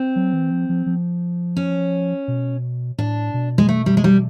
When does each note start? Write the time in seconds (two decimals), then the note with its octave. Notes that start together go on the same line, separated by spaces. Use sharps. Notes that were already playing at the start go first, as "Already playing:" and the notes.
Already playing: C4
0.16 F#3
0.33 E3
0.51 F3
0.69 F3
0.86 F3
1.57 C#4
2.28 B2
2.98 A2 D4
3.34 B2
3.58 G#3
3.69 A3
3.86 G3
3.97 G#3
4.04 G3